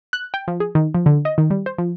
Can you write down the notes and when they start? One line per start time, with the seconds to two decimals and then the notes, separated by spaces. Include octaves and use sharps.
0.13 F#6
0.34 G5
0.48 F3
0.60 G#4
0.75 D#3
0.95 F3
1.06 D3
1.25 D#5
1.38 D#3
1.50 G3
1.66 C5
1.78 F3